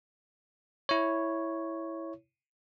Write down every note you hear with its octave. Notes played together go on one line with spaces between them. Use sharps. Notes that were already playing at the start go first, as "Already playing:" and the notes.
E4 C#5